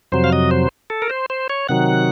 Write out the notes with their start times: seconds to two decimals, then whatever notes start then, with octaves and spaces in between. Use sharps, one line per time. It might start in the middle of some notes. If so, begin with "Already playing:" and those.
0.12 F2 C3 F#3 C5
0.24 F5
0.33 D#5
0.51 C5
0.90 A4
1.02 A#4
1.10 C5
1.30 C5
1.50 C#5
1.69 C3 D#3 F#3 F#5